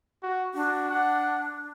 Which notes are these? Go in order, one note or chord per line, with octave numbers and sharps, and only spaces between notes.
F#4
D4 F#4
F#5